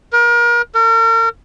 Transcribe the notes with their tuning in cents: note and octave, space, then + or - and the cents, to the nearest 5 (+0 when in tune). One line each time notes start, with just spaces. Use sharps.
A#4 +35
A#4 -40